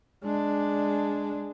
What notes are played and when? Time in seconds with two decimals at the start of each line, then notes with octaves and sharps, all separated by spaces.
0.24 G#3 D4